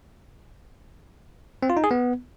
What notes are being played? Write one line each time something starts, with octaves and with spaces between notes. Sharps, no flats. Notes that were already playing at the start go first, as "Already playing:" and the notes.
C4
F4
D#4
G#4
B3